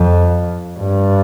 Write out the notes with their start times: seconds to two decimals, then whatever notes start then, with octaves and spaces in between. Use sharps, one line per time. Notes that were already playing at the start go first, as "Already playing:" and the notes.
Already playing: F2
0.79 G2